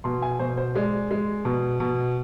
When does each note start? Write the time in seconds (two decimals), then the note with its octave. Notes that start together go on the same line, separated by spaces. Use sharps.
0.04 B2 C6
0.22 G#5
0.39 B2 C5
0.58 C5
0.75 G#3 D5
1.11 G#3
1.45 B2
1.80 B2